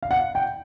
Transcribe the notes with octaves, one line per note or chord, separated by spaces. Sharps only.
F5
F#5
G5